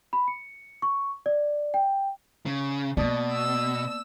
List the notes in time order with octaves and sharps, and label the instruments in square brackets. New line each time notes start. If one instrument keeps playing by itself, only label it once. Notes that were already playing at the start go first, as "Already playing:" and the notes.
[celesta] B5
C#7
C#6
D5
G5
[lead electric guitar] C#3
[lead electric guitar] B2 [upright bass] A#3 B3 [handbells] D5 A5 D#6
[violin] E6